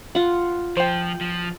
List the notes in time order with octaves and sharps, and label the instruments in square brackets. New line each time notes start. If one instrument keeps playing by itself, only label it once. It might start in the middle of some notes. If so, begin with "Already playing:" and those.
[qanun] F4 F#5
[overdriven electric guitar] F3 [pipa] C5 G5
[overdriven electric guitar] F3